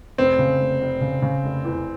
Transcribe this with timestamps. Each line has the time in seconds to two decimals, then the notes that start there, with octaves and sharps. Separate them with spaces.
0.18 F1 C4
0.39 C#3
0.59 F1
0.81 F1
1.01 C#3
1.22 C#3
1.44 F1
1.65 E2